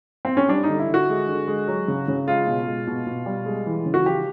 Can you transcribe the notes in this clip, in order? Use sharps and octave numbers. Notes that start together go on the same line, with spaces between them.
C4
C#4
G3 D4
D#4
D3
E4
D3
F#4
G#3
D3
G#3
F#3
C#3
C#3
G#3 F4
B2
G#3
B2
B2
G3
G#3
E3
C#3
F#4
F3 G4